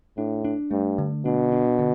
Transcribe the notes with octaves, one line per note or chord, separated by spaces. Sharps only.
A2 D4
D4
G2 A3
D3
B2 D4
D4
D3